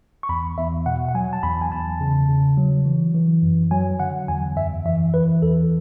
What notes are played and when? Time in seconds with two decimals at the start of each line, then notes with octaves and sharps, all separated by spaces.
0.23 C#6
0.29 E2 B5
0.58 E2 E5
0.86 B2 F#5
1.09 F#5
1.15 F#3 G#5
1.33 A5
1.43 E2 B5
1.62 G#5
1.72 E2 A5
2.01 C#3
2.28 C#3
2.57 F#3
2.85 E3
3.14 E3
3.43 F#2
3.71 F#3 G#5
4.00 D3 F#5
4.28 E2 G#5
4.57 F#2 E5
4.86 E3 E5
5.14 E3 B4
5.42 E2 A4